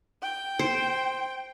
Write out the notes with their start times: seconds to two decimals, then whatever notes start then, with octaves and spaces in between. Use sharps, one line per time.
0.23 G5
0.59 C5